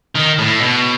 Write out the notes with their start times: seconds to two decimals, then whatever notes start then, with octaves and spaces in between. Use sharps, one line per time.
0.15 D#3
0.38 A2
0.61 B2